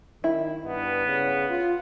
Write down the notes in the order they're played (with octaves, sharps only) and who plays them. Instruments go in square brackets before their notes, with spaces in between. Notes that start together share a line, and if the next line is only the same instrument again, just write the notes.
[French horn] D#3 [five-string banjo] E4
[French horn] G2 [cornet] B3
[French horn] C#3
F4